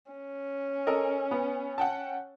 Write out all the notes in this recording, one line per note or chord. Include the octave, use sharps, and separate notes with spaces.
C#4
A4 A#4 D#5
B3
F#5 G5 A5